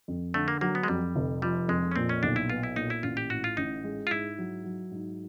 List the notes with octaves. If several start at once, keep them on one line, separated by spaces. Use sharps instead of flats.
F2
D3 A3
A#3
F#3 A#3
B3
G#3
F2 G3
F1
F3 G3
F2 G#3
C#4
A#2 C4
C#4
B1 D4
E4
B3 F4
E4
A#2 D#4
E4
A1 F4
G4
A2 F#4
F4
A1 D#4
G#3
F4
G#2 E4
F#3
F#3
G#2